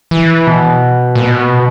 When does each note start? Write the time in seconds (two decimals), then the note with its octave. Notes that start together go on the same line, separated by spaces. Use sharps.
0.11 E3
0.47 B2
1.15 A#2
1.21 B2